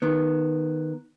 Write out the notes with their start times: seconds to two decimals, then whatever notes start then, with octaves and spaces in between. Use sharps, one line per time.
0.02 D#3 B3